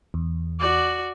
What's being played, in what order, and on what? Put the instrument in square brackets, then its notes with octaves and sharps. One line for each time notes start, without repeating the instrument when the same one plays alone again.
[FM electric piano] E2
[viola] F#4 D5